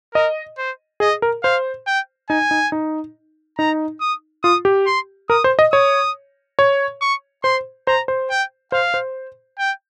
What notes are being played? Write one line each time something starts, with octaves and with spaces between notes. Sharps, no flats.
A#4 D#5
C5
G#4 D#5
A#4
C5 F5
G5
D#4 G#5
D#4
D#4
D#4 A#5
D#6
F4 D#6
G4
C6
A#4 D#6
C5
D#5
C#5 D#6
C#5
C#6
C5 C6
C5 A#5
C5
G5
C5 F5
C5
G5